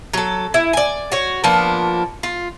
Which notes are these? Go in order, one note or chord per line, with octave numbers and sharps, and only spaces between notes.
F#3 A4
E4
D5 G#5
F#4 C#5
F3 A#3 B3 D4
F4